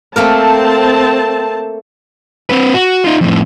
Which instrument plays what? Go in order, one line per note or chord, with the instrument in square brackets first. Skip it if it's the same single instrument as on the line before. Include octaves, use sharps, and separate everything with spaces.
[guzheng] A3 A#3 A#4 [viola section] C4 A5
[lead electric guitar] C4 B4
F#4
D#4 F4
F2 A2